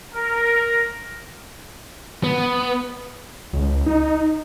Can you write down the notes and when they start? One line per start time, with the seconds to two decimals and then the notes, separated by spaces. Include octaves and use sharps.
0.13 A#4
2.24 B3
3.53 C#2
3.86 D#4